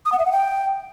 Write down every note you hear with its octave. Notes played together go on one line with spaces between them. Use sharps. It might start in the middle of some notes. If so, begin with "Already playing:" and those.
D#6
F#5
E5
F#5
G5